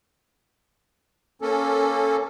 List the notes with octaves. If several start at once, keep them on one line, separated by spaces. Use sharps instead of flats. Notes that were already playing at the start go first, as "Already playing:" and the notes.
A#3 C#4 A4